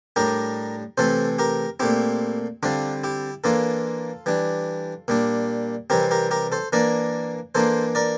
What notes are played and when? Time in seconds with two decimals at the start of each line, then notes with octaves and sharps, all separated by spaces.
0.16 A2 G3 D4 G4 A#4
0.98 C3 E3 A3 C4 A4 C5
1.39 G4 A#4
1.80 A#2 A3 C4 E4 G4
2.63 D3 G3 C4 D4 F4
3.04 E4 G4
3.44 E3 A#3 D4 F4 A4
4.26 E3 G3 D4
5.08 A#2 G3 D4
5.90 C3 E3 G3 C4 G4 A#4
6.11 G4 A#4
6.31 G4 A#4
6.52 A4 C5
6.72 E3 A#3 D4 A#4 D5
7.55 E3 A#3 D4 A4 C5
7.95 A#4 D5